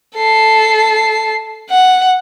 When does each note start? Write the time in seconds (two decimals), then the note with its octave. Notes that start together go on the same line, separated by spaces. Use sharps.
0.16 A4 C7
1.70 F#5